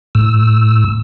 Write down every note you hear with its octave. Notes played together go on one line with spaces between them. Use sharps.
A2 E6